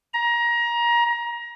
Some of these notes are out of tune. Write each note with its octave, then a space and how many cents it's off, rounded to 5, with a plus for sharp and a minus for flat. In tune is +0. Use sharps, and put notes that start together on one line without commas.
A#5 +25